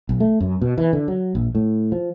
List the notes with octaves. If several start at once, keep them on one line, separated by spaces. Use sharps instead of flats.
B1
A3
F#2
B2
E3
D3
F#3
A#1
A2
F3